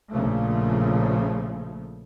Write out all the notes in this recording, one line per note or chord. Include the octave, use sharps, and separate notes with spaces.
A#1 A#2 C#3 F3 A3